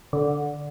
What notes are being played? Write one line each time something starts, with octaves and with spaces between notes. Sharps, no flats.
D3